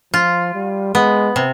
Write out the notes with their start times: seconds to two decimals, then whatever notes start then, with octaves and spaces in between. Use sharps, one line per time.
0.13 F3 F4
0.54 G3
0.94 G#3 B3
1.36 C3